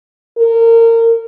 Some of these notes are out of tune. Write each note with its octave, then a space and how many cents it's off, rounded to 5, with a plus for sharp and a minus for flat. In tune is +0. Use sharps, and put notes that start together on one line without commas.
A#4 -25